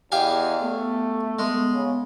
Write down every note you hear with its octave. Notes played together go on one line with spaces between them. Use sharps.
E2 G4 D#5 F5 G#5
A3 B3
G#3 B3
C#3